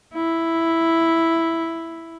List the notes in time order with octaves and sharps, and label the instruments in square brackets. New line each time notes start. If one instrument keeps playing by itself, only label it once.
[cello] E4